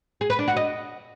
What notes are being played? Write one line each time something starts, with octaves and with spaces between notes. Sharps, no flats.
G#4
B4
D4
F#4
D#5